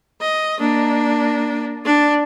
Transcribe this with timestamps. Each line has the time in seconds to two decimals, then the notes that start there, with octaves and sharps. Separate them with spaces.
0.21 D#5
0.59 A#3 D4
1.85 D4